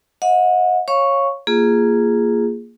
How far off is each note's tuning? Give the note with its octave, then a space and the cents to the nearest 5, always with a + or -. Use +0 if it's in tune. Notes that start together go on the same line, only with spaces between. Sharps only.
D#5 +25 F#5 -35
C#5 -10 F5 +0 C#6 +0
A#3 +0 F4 -15 G#4 -5